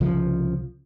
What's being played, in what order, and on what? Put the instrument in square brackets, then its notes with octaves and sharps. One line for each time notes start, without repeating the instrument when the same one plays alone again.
[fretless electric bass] C2 C#3 F3